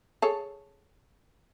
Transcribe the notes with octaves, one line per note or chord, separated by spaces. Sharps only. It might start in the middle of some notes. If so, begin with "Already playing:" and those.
G#4 A4 C#5